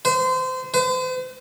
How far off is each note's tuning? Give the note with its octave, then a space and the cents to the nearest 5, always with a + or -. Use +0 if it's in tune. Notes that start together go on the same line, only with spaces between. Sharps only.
C5 -30
C5 -45